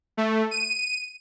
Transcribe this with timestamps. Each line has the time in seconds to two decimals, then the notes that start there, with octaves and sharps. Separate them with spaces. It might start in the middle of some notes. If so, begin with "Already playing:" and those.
0.17 A3
0.51 D#7